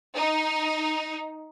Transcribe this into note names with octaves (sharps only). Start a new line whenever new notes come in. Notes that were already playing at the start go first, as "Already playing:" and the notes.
D#4